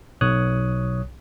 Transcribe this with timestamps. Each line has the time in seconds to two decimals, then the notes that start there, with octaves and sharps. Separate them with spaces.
0.21 B1 C#5 D#6 F#6